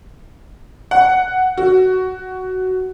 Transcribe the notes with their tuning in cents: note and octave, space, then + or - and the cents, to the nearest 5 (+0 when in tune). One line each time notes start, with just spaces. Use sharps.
F#5 +5
F#4 +10